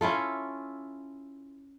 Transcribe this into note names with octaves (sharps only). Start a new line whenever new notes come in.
C#4 E4 F4 A4